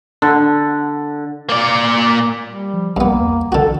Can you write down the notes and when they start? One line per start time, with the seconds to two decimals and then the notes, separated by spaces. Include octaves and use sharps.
0.22 D3
1.49 A#3 D5
2.47 G3
2.74 F3
2.97 B1 G2 A#3 B3
3.19 E2
3.52 B1 D3 F#4 A4